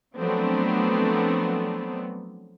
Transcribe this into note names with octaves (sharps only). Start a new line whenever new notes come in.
F3 F#3 A3 B3 C4 D4